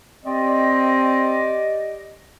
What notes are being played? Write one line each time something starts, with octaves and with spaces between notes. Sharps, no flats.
C4 G4 D5 D#5